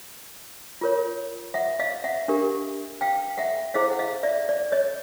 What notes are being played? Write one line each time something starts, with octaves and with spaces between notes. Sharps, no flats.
F4 A#4 C#5
E5 F#5
D#5 F5
E5 F#5
D4 G4 A#4
F5 G5
E5 F#5
E4 G#4 C5 D#5 F5
F#5
D#5 F5
D5 E5
D5
C#5 D#5